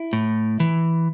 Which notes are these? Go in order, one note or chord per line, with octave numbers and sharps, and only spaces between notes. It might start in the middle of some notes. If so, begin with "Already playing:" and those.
Already playing: E4
A2
E3